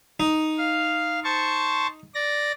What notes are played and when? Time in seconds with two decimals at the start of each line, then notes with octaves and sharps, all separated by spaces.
0.20 D#4
0.58 F5
1.24 C5 A5 C#6
2.14 D5 A#6